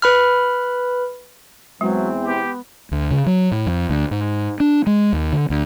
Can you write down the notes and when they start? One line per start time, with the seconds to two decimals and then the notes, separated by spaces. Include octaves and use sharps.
0.02 B4 B5 F6
1.81 E2 E3 F#3 G#3 C4
2.24 B3 G4
2.92 D2
3.11 C#3
3.26 F#3
3.51 A2
3.66 F2
3.89 D2
4.11 G#2
4.60 D4
4.87 G#3
5.13 D#2
5.33 D3
5.50 D2